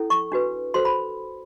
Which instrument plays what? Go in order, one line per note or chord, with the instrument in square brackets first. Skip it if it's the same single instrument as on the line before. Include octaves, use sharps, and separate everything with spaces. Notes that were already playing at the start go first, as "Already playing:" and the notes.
Already playing: [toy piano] C#4 E4 A4
C#6
D4 F#4 B4
F#4 A4 C5 C6
B5